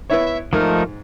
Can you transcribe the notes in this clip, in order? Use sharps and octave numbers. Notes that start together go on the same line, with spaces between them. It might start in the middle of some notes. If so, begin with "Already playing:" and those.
B3 E4 C#5 E5
G#2 F3 A3 D#4 A#4